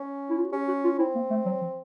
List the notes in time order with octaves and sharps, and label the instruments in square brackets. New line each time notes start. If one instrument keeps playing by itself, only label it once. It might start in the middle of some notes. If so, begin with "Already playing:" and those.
Already playing: [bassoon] C#4
[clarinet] E4
F4
F#4
[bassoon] C#4 [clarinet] G4
[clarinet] F#4
F4
[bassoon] C4 [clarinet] E4
[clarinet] A#3
A3
F#3
F3